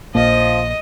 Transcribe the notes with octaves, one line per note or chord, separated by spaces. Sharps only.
A#1 F3 A#3 D#5